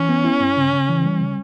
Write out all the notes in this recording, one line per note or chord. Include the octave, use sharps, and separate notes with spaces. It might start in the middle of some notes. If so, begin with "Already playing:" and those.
Already playing: E3 C#4
B3
E4
G2
C#3
C#3
E3
G3
C#3